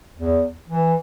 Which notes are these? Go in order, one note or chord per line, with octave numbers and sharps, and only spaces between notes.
E2
E3